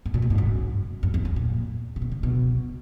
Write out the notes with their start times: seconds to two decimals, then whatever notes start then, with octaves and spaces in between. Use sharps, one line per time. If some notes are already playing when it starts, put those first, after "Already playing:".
0.06 G#2
0.14 A#2
0.22 B2
0.30 G#2
0.38 F#2
1.03 F#2
1.14 E2
1.25 F#2
1.36 A#2
1.96 C#3
2.02 B2
2.12 C#3
2.23 B2